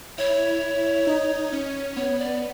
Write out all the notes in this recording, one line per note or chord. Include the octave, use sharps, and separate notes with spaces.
E4 C#5
D#4
C#4
B3 C#5
D5